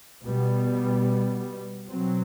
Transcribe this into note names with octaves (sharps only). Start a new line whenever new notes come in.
B2 G3 B3
B2 F#3 C4